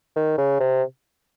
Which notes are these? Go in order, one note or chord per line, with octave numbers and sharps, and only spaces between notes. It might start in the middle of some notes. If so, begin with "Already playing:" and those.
D#3
C#3
C3